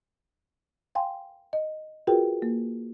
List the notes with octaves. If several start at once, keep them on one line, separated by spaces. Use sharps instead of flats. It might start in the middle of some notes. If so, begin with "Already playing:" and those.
F5 G5 G#5 C6
D#5
F4 F#4 G#4 A#4 B4 G5
A#3